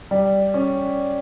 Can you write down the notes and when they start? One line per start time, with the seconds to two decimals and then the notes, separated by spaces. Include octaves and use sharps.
0.11 G3
0.54 C#4